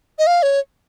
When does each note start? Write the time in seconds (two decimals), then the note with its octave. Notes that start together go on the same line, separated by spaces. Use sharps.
0.19 D#5
0.27 F5
0.43 C#5